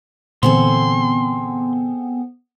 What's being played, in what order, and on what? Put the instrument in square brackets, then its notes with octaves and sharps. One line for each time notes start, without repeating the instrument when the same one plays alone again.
[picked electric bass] A#2 D3 E3 [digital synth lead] B3 [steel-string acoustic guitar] C4 G#4 A4 [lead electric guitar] C6